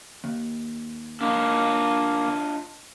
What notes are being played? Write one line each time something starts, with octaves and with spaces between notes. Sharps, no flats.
D#2
A#3 D4 F4 D#5